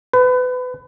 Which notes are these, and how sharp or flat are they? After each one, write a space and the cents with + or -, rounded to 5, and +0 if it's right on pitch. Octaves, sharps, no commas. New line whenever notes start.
B4 +30